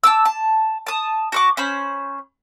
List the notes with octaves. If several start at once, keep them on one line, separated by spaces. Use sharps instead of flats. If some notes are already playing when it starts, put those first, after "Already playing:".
A5 D6 E6
A5
A5 D#6
F#4 C#6 D6
C#4 C5 B5